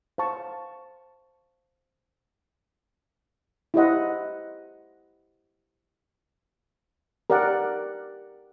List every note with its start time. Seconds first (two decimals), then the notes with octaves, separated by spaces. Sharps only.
0.18 C5 F5 A5 C#6
3.74 E4 G4 C5 D#5 F#5
7.30 G4 A#4 D5 F#5